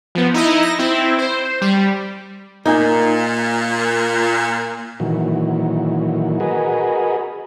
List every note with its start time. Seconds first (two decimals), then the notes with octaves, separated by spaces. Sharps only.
0.15 F3 B3
0.34 D#4 E4 D#5
0.62 A#6
0.79 C4 E4
1.18 C5
1.61 G3
2.66 A#2 A#3 D#4 G#5
5.00 A#2 D#3 E3 F#3
6.40 F#4 G#4 A#4 B4 D#5